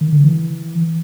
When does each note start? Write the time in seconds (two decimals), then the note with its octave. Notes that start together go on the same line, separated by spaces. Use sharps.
0.01 D#3
0.12 D3
0.24 E3